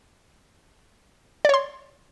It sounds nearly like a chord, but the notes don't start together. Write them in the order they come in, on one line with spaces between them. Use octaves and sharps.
D5 C#5 C6